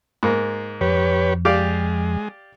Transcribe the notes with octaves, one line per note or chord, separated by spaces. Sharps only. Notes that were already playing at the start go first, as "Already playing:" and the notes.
G#2 A#3
F2 G4 B4 C#5
G#3 G4 D5 F5